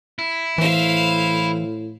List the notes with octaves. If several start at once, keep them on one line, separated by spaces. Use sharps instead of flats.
E4
A2 E3 C5 F5